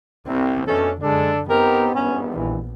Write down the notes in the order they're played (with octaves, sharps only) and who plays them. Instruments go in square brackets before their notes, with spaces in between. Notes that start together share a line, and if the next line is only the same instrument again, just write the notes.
[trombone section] C2 [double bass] C4
[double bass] F2 D4 [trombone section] B2 A3 C#4 [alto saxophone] A4
[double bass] F#2 D3 [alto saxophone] G#3 [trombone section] D4 A4
[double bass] B3 [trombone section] C4 D#4 G4 [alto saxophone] A#4
[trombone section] G#1 E2 G2 [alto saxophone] C#4
[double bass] A#1 [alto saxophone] E3